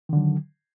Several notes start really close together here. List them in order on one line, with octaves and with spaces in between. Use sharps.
D#3 D3 F#3